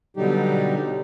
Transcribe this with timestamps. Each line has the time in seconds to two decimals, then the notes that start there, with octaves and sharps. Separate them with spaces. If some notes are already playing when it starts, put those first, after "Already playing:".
0.17 B2 D3 F#3 G3 D#4 G4